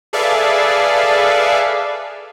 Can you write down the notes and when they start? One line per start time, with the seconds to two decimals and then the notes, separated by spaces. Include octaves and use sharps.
0.13 G#4 A4 B4 D5 E5 F5